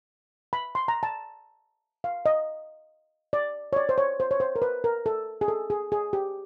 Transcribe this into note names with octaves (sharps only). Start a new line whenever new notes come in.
B5
C6
A#5
A5
F5
D#5
D5
C#5
D5
C5
C#5
C5
C#5
C5
A#4
B4
A#4
A4
G#4
A4
G#4
G#4
G4